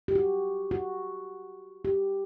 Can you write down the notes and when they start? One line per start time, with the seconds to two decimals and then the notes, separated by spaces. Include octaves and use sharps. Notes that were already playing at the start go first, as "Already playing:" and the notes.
0.08 G4
0.15 F#4
0.71 F#4
1.85 G4